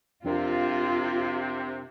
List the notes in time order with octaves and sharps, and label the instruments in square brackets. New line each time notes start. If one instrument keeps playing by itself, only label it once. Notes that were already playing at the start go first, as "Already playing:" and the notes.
[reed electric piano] F2 D4 A#4 [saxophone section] C3 [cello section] F4